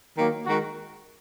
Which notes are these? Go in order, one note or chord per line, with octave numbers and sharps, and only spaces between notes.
D#3 F#3 A#3
D#3 G#3 F#4